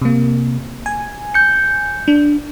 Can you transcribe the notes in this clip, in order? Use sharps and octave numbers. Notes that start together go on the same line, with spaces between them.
C3 A#3
G#5
G6 C#7
D4